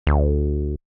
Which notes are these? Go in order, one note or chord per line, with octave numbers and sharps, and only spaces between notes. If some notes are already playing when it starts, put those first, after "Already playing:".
D2